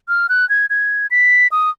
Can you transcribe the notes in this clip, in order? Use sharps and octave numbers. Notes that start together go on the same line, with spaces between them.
F6
F#6
G#6
G#6
B6
D#6